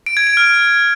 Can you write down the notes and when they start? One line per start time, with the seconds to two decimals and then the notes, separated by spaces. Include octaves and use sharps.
0.06 D7
0.17 G#6
0.27 D7
0.37 F6